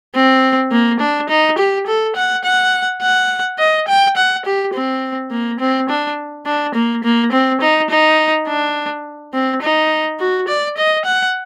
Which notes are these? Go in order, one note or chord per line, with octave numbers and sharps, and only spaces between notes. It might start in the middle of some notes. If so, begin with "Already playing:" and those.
C4
A#3
D4
D#4
G4
A4
F#5
F#5
F#5
D#5
G5
F#5
G4
C4
A#3
C4
D4
D4
A#3
A#3
C4
D#4
D#4
D4
C4
D#4
F#4
D5
D#5
F#5